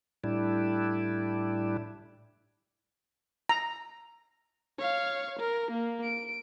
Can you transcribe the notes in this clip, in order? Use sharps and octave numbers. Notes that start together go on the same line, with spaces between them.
A2 G3 D4 E4
A#5
C#5 F5
A#4
A#3
D7